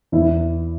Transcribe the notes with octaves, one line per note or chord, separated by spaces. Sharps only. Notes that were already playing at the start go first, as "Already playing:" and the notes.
E2 E4